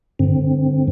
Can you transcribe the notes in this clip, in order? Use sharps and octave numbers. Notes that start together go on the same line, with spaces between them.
G2 D3 C4